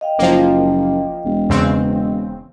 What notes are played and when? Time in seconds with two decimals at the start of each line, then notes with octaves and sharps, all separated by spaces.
0.01 D#5 F5 G5
0.19 F#1 F3 A#3
1.25 E1
1.50 E2 C#3 C4